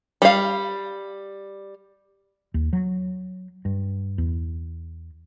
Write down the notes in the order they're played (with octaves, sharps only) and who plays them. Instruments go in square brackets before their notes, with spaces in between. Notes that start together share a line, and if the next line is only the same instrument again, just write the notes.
[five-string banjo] G3 F5
[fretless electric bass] D#2
F#3
G2
E2